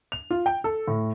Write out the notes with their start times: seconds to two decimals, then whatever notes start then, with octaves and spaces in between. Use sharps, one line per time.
0.12 F7
0.31 F4
0.46 G5
0.64 A4
0.88 A2